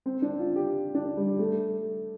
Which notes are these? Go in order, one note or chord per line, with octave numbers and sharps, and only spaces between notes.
C4
D4
F4
G4
D4
G3
A3